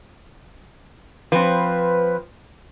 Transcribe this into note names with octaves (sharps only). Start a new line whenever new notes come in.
F3 C4 B4